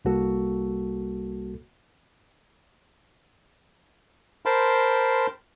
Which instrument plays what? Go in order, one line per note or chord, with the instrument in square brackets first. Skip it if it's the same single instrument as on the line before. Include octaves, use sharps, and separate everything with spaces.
[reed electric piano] C2 G3 A#3 F#4 A4
[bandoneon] A#4 C5 G5 A5 B5 C6